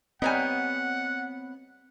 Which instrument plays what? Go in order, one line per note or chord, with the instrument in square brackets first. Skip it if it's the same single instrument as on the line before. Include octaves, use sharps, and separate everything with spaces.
[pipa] G3 D#4 D#5 [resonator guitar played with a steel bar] B3 C#5 G#5 [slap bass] C4 [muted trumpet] F#5